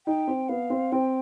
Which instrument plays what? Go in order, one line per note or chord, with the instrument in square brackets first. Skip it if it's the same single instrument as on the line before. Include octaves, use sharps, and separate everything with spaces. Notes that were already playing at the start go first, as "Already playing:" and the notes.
[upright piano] D#4 [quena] G5
[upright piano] C4
[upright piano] B3 [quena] F5
[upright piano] C4
[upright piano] C4 [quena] G5